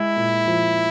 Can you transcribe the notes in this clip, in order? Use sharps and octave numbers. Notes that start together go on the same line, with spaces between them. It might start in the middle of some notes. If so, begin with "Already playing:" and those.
Already playing: G#3 E4
A#2
F3